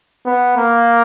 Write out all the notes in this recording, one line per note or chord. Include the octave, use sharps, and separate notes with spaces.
B3
A#3